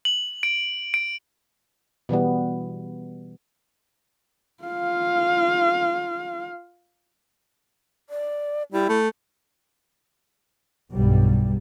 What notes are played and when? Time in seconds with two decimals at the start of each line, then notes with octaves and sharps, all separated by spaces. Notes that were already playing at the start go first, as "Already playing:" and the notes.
0.05 F#7
0.43 D7
0.94 D7
2.09 B2 E3 G3 B3
4.64 F4 F5
8.09 D5
8.72 G3 E4
8.89 A3
10.92 B1 E2 G2 G3